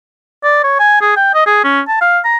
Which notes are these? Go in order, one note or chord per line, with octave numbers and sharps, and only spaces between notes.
D5
C#5
G#5
G#4
G5
D#5
G#4
C#4
A5
F5
A#5